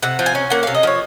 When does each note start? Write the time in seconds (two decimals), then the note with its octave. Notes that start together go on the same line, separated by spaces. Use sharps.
0.03 C3 F#5
0.19 F3
0.26 G#5
0.35 C#4
0.50 A#3 F#5
0.63 C3 F5
0.75 D#5
0.83 F3 C#5